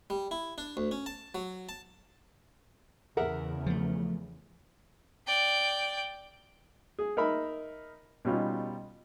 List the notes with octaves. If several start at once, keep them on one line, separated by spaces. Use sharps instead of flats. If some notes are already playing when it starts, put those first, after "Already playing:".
G3
E4
D4
D2
C#4
A5
F#3
A5
E2 C#3 A#4 E5 F#5
F3 A3
D5 G5
G#4
D#4 A#4 E5 B5
B2 G3 C#4 D#4 F4